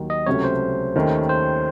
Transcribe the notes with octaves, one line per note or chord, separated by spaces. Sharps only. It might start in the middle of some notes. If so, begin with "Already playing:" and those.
Already playing: D#2 D#3 F#3 A#3
D#5
C#2 C3 F#3 A3 C#4 C#5
C5
D#2 D#3 A3 C#4
C5